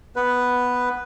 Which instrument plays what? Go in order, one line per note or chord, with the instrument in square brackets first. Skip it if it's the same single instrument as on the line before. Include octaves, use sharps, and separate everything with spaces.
[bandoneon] B3 B4